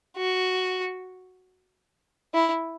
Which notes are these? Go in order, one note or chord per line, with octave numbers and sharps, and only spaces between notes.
F#4
E4